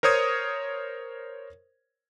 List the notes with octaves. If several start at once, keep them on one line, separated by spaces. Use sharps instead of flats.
A#4 C5 C#5 D#6 G#6